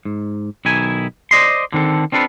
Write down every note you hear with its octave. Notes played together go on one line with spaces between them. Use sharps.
G#2
B1 D#3 E4 G#5
C5 D5 D#5 C6
D3 D#3 C4 A4
C4 D4 F4 A4 B4